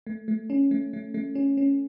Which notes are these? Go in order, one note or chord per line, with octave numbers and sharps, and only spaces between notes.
A3
A3
C#4
A3
A3
A3
C#4
C#4